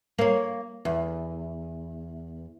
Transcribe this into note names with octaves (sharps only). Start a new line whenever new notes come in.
A#3 C#5
E2